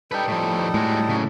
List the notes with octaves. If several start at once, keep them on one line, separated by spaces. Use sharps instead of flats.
G3 D#4 A4 B4 G5
A2 F3
A2 G#3 F#4
C#3 F#3